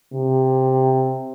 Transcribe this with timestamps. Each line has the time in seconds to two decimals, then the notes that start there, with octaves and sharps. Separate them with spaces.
0.13 C3